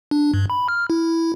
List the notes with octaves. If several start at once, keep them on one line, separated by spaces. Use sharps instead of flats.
D4
G2
B5
F6
E4